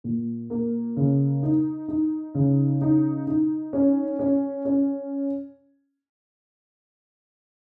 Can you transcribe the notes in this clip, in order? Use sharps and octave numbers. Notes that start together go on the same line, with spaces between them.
A#2
A#3
C#3
D#4
D#4
C#3
D#4
D#4
C#4
C#4
C#4